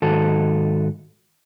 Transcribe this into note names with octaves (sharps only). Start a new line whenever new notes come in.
G#2 D#3 F#4 A4